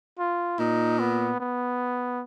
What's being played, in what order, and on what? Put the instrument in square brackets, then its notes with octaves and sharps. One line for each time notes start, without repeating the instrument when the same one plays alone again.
[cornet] F4
[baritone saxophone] A#2 [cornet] D#4
[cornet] B3
B3